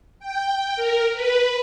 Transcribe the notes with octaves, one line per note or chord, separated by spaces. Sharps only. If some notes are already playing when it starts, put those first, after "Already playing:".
G5
A#4
B4